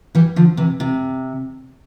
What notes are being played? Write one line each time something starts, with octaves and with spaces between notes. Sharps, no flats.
E3 G3
D3 F3
C3 E3
C3